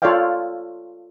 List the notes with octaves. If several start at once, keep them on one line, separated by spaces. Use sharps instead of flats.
F4 A4 C#5 D5 F5 G5